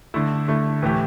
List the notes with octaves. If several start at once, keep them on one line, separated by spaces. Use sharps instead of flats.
D3 A3 E4
D3 A3 E4
A2 E3 A3 E4 G4